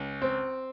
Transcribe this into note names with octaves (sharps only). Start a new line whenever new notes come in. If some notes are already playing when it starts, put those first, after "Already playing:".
Already playing: C#2
C4